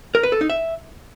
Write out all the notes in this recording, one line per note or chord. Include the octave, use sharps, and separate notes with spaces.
A#4
B4
A4
D#4
E5